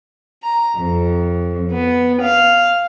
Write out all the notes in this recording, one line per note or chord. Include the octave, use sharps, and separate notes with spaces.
A#5
F2
B3
F5